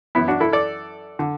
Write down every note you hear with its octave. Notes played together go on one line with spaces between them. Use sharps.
F#2 E3 B3 E4
D4 F#4
E4 A4
A4 D5
D3